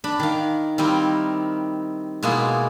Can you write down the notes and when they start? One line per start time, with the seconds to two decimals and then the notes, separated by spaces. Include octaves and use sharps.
0.04 D4 B5
0.19 D#3 F5
0.78 D#3 G3 C4 E4 A#4
2.23 B2 G#3 A#3 E4 F4 G#4